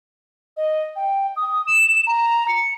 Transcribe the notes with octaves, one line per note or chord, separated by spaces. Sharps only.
D#5
G5
D#6
E7
A#5
C#7